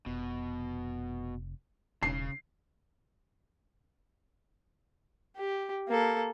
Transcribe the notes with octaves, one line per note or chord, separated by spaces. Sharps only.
F1 B2
E1 C#3 C7
G4
A#3 A4